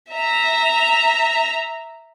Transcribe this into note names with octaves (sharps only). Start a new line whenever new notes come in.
E5 A#5